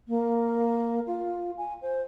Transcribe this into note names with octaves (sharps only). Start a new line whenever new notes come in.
A#3
F4
G#5
C5